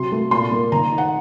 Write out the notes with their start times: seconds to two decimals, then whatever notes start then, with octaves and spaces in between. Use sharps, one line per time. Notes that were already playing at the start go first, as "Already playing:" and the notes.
Already playing: C3 F#3 C6
0.12 A3
0.31 A#2 C6
0.51 A#3
0.72 D#3 A#5
0.92 D#4
0.98 F#5